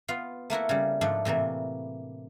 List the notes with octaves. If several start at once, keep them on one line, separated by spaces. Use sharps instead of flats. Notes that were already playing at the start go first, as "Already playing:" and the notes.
B3 F4 F5
A3 A#3 E4 F#4
C#3 G3
G#2 F3 A3 D4
A2 C3 E3 A#3